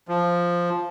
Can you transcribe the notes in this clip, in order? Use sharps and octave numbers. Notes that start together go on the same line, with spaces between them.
F3